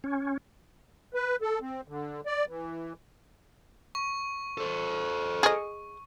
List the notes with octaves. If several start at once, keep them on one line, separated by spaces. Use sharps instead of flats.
C#4
B4
A4
C4
D3
D5
E3
C#6
A4 C5
G#4 D#5